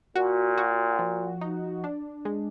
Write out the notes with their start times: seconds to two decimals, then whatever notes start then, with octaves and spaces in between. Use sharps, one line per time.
0.16 A#2 F#4
0.58 F#4
0.99 F3
1.41 D#4
1.84 D4
2.25 G#3